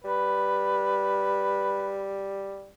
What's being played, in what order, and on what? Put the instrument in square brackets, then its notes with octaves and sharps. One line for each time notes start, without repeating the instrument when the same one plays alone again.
[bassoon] G3 [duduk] B4